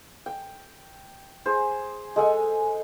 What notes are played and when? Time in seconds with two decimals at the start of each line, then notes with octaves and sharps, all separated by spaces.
0.26 G5
1.46 G#4 C5
2.16 G#3 A4 F#5 G#5